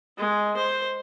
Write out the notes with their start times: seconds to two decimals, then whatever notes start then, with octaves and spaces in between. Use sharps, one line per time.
0.18 G#3
0.57 C5